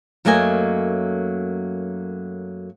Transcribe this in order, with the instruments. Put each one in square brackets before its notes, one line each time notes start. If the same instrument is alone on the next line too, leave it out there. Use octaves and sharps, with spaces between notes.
[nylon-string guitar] F#2 F#3 A3 A#3 D#5 G#5